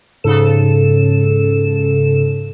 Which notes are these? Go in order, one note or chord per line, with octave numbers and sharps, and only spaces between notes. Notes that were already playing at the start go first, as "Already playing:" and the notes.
G#2 C#3 A4 E7